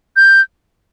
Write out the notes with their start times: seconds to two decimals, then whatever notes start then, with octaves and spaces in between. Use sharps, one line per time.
0.16 G6